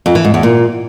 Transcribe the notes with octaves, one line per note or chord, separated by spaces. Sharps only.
F2
E3
G#2
E2
A#2